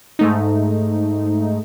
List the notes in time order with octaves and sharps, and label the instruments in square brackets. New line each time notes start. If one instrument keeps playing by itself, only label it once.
[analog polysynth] G#2 A3 D#4